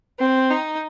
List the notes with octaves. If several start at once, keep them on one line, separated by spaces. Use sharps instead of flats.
C4
D#4